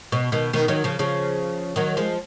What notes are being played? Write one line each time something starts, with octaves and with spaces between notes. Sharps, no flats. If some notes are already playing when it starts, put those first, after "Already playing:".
B2
B2 D#3
B2 D#3
D#3 F#3
C#3 F3
C#3 F3
D#3 F#3
F3 G#3